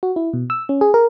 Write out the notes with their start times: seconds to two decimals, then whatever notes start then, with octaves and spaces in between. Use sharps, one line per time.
0.03 F#4
0.16 E4
0.33 B2
0.50 E6
0.69 C#4
0.81 G#4
0.94 A#4